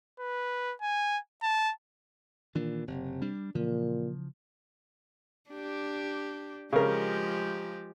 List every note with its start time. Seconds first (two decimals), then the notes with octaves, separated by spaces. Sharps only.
0.20 B4
0.82 G#5
1.43 A5
2.55 A#2 D#3 E3 D4
2.87 F#1 C3
3.22 G3 D4
3.55 A#2 C#3 E3 F3
5.50 D4 G4
6.73 C#3 F3 G#3 G4 A#4